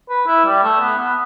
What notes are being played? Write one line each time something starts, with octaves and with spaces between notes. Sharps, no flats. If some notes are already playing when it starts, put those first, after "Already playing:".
B4
E4
G3
A3
B3
B3